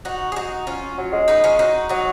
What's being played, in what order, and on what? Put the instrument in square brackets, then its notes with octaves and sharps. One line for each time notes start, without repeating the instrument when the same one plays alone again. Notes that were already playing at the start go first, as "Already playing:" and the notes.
[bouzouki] D#4 F#4
G#4
D#4 F#4
C#4 F4
[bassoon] F#3
G#3
[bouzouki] B3 D#4
C#4 F4
D#4 F#4
[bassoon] F#3 [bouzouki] D#4 F#4